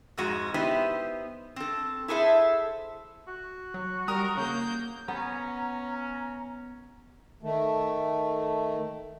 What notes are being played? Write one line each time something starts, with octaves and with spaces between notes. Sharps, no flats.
F2 G#2 G#3 F#4
B3 D#4 E4 G4 C5
C4 A4
E4 G#4 A4 C5 E5
F#4
F#3
G3 A#4 A#5 D#6
C#3 A#3 G6
B3 C#4 A#5
D#3 A3